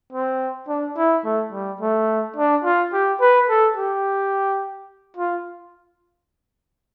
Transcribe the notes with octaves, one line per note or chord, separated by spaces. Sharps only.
C4
D4
E4
A3
G3
A3
D4
F4
G4
B4
A4
G4
F4